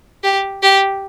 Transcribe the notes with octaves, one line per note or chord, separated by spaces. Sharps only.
G4
G4